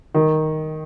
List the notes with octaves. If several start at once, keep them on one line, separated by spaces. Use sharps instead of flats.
D#3